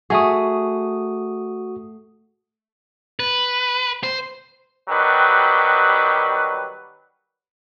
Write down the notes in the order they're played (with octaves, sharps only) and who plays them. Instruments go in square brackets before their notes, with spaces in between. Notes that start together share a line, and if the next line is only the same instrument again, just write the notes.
[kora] A3 G#4 [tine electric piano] F#4 D#6
[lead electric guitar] B4
C5
[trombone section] D#3 F#3 G3 G4 B4